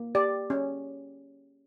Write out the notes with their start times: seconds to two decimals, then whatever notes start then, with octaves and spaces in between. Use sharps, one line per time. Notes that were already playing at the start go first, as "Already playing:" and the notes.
Already playing: A#3
0.15 G4 D5
0.50 C#4